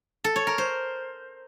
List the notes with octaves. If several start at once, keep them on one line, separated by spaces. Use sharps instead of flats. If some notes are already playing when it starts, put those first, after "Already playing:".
A4
C#5
A#4
C5